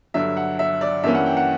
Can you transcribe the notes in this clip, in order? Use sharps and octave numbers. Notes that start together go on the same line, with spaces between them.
G2 D3 F#3 E5
F#5
E5
D5
G2 E3 A#3 C#4 E5
F#5
G5
F#5